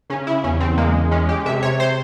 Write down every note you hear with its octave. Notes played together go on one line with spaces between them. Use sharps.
C#3 C#4
E4
E2 C#4
C4
G#3 A#3
G#3 C#4
G4
C3 E5
C#5
C5